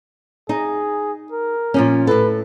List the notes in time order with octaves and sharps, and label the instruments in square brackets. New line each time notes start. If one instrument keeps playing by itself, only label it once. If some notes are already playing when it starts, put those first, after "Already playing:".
[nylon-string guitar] D#4 [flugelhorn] G#4
[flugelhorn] A#4
[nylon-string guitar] A#2 F3 C#4
[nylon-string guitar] A2 A4 [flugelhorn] B4